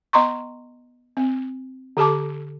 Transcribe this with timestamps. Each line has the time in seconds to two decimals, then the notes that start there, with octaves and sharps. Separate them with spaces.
0.13 B3 D#5 A#5 C6 C#6
1.17 C4
1.97 D3 G4 A4 A5 D6